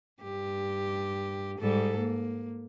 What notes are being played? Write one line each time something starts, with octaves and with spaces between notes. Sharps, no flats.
G2 G4
G#2 G3 A4
A#3